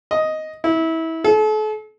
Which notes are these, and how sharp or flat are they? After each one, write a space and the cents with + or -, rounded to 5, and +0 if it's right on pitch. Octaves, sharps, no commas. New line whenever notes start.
D#5 +5
E4 -25
A4 -40